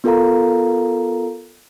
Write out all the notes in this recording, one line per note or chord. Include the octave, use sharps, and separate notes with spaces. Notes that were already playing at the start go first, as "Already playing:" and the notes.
B3 F4 A4 A#4 F5 A#5